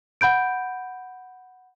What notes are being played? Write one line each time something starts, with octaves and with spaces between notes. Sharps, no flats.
F#5 B5 G6 D7